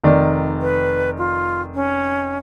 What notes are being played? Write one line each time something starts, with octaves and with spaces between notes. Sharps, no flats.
F1 D#3 D5
B4
F4
C#4